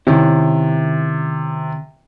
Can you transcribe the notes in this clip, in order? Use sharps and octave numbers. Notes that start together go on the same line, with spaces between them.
C3 D#3 C#4 E4